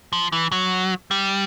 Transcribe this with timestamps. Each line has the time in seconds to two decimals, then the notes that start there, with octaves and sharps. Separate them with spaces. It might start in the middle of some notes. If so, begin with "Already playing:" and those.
0.13 F3
0.32 E3
0.52 F#3
1.11 G3